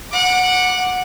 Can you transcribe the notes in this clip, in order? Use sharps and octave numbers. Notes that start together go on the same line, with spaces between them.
F#5 D6